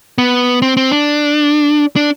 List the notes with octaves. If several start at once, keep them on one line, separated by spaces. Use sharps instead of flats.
B3
C4
C4
D4
D4